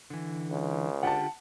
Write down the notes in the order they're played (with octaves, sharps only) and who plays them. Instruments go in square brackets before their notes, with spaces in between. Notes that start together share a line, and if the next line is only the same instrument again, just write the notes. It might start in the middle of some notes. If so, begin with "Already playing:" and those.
[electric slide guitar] D3 E3
[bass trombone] C#2
[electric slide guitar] D3 F4 G4 [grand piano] F#5 A5